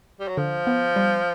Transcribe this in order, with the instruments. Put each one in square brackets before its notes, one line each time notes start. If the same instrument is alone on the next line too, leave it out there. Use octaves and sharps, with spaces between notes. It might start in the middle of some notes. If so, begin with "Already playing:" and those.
[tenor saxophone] G3
F#3
[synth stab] D3 [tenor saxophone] F3
[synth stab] B3
G3